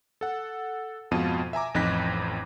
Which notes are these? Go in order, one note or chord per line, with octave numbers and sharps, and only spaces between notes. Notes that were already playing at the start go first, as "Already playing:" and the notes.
A4 F#5
F2 G#2 B2 F4 A5 D#7
E5 G#5 A#5 D6
A1 F2 D#4 F#6 A#6 B6